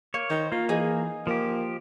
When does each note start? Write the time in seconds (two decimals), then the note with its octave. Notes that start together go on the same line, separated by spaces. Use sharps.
0.14 A#3 C#5
0.30 D#3 C5
0.52 A#3 F4
0.69 E3 D#4 G#4 G#5
1.27 F3 A#3 G4